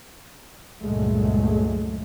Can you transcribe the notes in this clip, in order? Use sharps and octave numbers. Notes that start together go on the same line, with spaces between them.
C#2 G2 A#2 F#3 G#3 A3